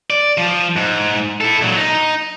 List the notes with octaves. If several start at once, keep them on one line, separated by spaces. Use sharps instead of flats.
D5
F3
G#2
E4 A4
A#2 F#3
D#4